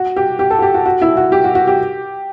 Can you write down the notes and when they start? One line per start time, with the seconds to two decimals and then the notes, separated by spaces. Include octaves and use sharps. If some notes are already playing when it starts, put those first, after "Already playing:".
Already playing: F#4
0.16 G4
0.39 G4
0.50 A4
0.58 F#4
0.62 G4
0.74 F#4
0.86 F#4
1.02 E4
1.17 F#4
1.32 G4
1.44 F#4
1.55 F#4
1.67 G4